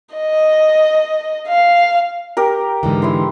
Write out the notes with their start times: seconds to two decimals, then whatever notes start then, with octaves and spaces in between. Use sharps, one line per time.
0.15 D#5
1.48 F5
2.37 G4 A#4
2.83 G#2 D3 E3
3.02 E4 C6